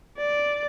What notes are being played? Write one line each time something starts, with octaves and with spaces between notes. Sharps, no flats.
D5